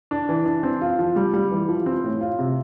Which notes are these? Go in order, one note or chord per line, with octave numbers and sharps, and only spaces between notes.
D4
E3
D4
C4
F4
F3
G3
G3
E3
F3
C4
A2
F4
C3